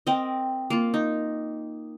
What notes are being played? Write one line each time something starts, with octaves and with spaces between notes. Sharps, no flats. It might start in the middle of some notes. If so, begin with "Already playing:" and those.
C4 A#4 D#5
A#3 F4
D#4